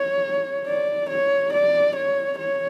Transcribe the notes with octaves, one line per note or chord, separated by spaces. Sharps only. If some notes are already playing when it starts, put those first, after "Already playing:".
Already playing: C#5
D5
C#5
D5
C#5
C#5